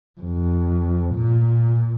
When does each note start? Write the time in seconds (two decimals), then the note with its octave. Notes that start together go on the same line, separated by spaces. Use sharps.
0.20 F2
1.14 A#2